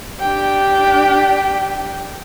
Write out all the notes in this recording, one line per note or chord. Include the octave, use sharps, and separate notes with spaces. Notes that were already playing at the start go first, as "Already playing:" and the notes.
D4 G4 G5